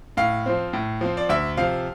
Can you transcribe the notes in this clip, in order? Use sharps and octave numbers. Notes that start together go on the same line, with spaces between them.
A2 F5
F3 C4
A2
F3 C4
D5
D2 E5
C3 F3 F5